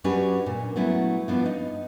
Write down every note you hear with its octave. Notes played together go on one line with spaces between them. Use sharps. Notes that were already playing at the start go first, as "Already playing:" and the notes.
F#3 C#4 D4 F#4 G4 B4
A#2
F#3 A3 B3 C#4 E4
F3 B3 D4 F4
D#4